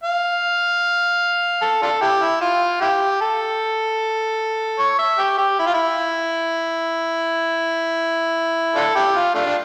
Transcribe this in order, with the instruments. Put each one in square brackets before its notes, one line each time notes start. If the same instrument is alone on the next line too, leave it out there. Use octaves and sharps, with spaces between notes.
[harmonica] F5
A4
D4 F4 A4
E4 G4
E4
F4
E4 G4
A4
C#5
E5
G4
G4
E4
F4
E4
D4 F4 A4
E4 G4
F4
A3 D4 F4
D4